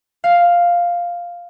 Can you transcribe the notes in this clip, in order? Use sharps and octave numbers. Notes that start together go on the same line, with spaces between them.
F5